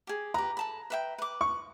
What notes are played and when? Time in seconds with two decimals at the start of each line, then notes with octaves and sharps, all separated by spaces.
0.07 G4 G#4
0.34 G4 B4 A#5
0.57 A4 A5 B5
0.90 B4 E5 G5
1.18 B4 D6
1.41 C#6